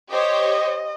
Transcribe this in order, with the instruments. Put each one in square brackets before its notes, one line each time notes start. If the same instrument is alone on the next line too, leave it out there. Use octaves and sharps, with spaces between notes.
[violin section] G4 C5 C#5 [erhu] D#5